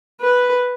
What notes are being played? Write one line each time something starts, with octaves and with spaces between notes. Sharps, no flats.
B4